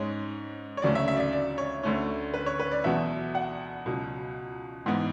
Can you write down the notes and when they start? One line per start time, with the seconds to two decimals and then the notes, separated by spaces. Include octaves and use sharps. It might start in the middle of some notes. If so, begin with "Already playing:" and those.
Already playing: G#2 G#3 C#4 C#5
0.77 C#5
0.82 D2 C#3 F#3 A3 C#4 D5
0.95 E5
1.08 E5
1.17 D5
1.20 E5
1.33 D5
1.58 C#5
1.83 D2 D3 A3 C#4
2.34 B4
2.46 C#5
2.60 B4
2.71 D5
2.84 E2 B2 F#3 B3 E5
3.35 F#5
3.86 C#2 B2 F#3
4.86 G#2 E3 B3